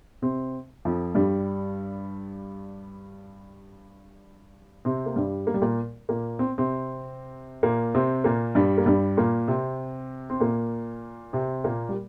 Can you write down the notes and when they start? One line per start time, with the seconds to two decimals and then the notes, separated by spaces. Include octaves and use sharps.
0.22 C3 C4
0.85 F2 F3
1.15 G2 G3
4.85 C3 C4
5.06 A#3
5.16 G2 G3
5.47 A#3
5.54 G3
5.62 A#2 A#3
6.09 A#2 A#3
6.39 C4
6.58 C3 C4
7.63 A#2 A#3
7.95 C3 C4
8.24 A#2 A#3
8.55 G2 G3
8.78 A#3
8.86 G2 G3
9.17 A#2 A#3
9.48 C3 C4
10.30 C4
10.40 A#2 A#3
11.33 C3 C4
11.64 A#2 A#3
11.89 G3